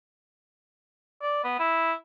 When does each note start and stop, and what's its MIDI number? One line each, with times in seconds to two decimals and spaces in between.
1.22 1.42 74
1.44 1.59 59
1.59 1.93 64